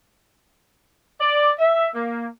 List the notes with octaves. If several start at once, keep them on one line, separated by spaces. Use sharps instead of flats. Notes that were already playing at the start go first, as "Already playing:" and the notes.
D5
E5
A#3